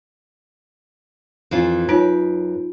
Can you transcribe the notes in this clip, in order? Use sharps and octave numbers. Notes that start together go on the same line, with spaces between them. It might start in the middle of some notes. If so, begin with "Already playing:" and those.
F2 E3 F4
F#2 D#4 F4 B4 D7